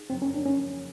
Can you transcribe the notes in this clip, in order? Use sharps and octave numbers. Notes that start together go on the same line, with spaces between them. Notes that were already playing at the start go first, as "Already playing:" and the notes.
Already playing: D#4 G#4
F2 C#3 F#3 A#3 C4
C#4
D4
C#4